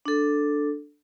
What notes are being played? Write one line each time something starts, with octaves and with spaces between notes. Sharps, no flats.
D4 A4